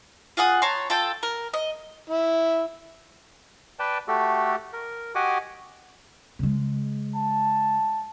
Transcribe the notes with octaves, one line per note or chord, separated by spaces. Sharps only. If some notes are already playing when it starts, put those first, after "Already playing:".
F4 G#4 F#5 D#6
C#5 A5 A#5 C6
F4 A4 G5
A#4
D#5
E4
B4 D5 G5 A5
A3 F#4 G4 A4
A#4
F#4 G4 D#5 F#5 G#5 D6
C#3 G#3
A5